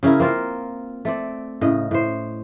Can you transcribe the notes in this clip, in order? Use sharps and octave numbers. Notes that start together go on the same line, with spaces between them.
C#3 C#4 E4 A#4
A#3 C4 F4 A#4
A3 C4 D5
A2 C#3 D#5
A2 C5